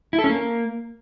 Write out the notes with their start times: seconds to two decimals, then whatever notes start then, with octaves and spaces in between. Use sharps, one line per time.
0.13 E4
0.19 A4
0.24 C#4
0.30 A#3